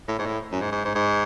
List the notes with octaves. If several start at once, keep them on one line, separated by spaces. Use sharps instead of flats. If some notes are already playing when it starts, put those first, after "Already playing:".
A2
G#2
A2
F#2
G#2
G#2
G#2
G#2